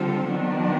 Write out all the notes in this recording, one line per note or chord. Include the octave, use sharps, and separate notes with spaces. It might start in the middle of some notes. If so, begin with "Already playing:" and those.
Already playing: D3 G3 C4 F4 A4
D#3 F#3 B3 D4